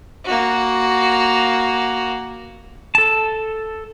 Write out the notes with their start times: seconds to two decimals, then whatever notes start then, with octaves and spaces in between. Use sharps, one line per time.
0.25 A#3 F#4
2.95 A4 A5